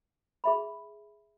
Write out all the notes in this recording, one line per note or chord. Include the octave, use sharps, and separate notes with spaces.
G#4 E5 B5